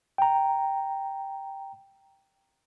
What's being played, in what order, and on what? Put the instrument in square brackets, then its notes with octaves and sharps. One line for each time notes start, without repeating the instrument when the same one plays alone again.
[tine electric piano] G5 A#5